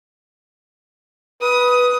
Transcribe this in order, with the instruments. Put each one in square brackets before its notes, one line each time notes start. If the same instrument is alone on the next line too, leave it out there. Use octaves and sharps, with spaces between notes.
[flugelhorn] B4 [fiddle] D#6